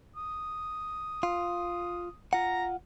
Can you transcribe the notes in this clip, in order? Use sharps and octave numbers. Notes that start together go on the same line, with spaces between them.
D#6
F4
F4 F#5 A#5